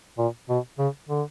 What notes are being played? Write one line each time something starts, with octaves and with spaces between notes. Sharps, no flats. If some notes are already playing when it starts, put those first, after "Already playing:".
A#2
B2
C#3
D3